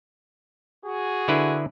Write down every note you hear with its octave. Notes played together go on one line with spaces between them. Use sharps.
F#4 G#4
D3 E4 B4